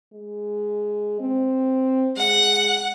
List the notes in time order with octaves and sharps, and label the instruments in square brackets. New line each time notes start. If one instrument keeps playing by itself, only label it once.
[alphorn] G#3
C4
[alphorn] G#3 [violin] F#5